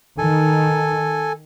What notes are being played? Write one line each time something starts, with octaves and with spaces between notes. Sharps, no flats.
D#3 A4 G#5